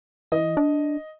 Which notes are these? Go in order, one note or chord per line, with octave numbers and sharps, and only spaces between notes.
E3 D#5
D4